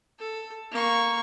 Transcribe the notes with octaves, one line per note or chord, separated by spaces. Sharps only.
A4
A#3 C#6